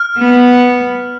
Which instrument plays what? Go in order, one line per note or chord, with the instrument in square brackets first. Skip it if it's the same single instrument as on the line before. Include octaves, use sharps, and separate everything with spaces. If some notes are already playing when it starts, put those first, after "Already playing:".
Already playing: [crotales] F6
[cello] B3